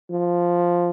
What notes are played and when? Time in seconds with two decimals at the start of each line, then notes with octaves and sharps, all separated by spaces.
0.11 F3